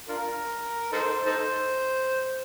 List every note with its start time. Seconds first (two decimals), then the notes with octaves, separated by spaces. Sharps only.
0.09 D4 F4 A#4
0.93 D#4 A4 C5
1.26 D#4 A4 C5